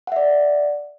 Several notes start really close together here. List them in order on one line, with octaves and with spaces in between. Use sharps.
F#5 E5 D5